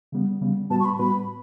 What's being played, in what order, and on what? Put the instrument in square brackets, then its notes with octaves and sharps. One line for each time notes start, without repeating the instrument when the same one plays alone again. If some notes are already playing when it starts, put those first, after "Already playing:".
[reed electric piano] C#3 G3 B3
C#3 G3 B3
[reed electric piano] A2 G3 B3 F#4 B4 [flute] A5
[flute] C#6
B5
[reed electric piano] A2 G3 B3 F#4 B4 [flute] B5